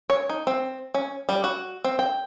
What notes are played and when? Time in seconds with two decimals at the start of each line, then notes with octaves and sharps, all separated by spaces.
0.10 C#5
0.29 D#4
0.47 C4
0.94 C#4
1.29 G3
1.44 F#4
1.84 C4
1.99 G5